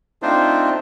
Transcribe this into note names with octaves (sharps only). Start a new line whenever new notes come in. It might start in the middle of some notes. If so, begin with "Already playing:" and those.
A3 C4 D4 D#4 F4 C5